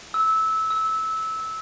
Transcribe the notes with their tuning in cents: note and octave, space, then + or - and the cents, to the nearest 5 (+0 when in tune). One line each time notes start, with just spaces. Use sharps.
E6 -20
E6 -20